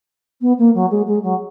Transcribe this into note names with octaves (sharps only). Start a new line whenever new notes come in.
B3
A#3
F#3
G#3
G#3
F#3